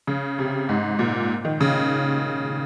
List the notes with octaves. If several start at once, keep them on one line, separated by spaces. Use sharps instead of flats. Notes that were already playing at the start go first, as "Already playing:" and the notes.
C#3
C3
G#2
A#2
D#3
C#3